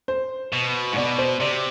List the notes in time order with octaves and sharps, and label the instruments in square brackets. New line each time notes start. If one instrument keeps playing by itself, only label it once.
[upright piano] C5
[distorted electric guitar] B2
G#2
[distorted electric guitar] B2 [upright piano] D5
[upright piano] C5
[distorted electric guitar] C3 [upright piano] D5